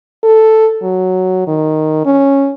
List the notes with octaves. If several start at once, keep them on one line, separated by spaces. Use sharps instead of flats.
A4
F#3
D#3
C#4